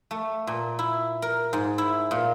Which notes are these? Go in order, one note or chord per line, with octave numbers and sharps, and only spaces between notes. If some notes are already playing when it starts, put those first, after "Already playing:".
A3
A#2
E4
A#4
G#2
E4
A#2